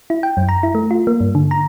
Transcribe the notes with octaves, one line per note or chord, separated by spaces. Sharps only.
E4
G5
F#2
A#5
E4
A3
F4
A#3
G2
D3
A#5